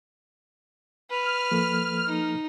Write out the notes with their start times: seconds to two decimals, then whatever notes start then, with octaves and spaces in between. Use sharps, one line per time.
1.10 B4 F6
1.51 F3 A#3 A4
2.06 D#4